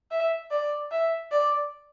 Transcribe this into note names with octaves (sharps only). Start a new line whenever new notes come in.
E5
D5
E5
D5